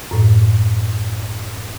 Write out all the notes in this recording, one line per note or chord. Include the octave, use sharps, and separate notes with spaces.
F#2 A2